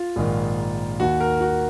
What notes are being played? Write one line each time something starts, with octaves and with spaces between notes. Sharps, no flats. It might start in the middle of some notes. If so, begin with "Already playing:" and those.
Already playing: F4
A#1 G#2 D#3
D#2 D#3 F#4
A#4
F#4